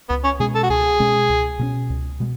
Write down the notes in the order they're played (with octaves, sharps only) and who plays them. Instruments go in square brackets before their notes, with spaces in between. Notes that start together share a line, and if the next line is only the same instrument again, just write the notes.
[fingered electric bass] C#2 [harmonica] B3
[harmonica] C#4
[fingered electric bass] B2 G#3 C#4 [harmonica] G#4
[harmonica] A4
F#4
[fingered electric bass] C#2 [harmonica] G#4
[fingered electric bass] B2 G#3 C#4
C#2
B2 G#3 C#4
C#2
B2 G#3